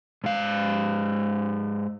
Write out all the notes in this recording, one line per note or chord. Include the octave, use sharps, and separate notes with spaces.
G#2 F5